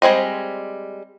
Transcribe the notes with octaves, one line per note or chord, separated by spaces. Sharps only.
G3 G#3 C4 D#5